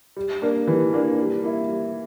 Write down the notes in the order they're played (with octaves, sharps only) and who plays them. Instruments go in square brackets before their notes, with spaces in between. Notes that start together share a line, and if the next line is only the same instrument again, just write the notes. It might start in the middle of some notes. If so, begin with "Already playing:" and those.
[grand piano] G3
A#3 D4 A#4
[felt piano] E3 [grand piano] G3
[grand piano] A#3 D4 A#4
G3
A#3 E4
G3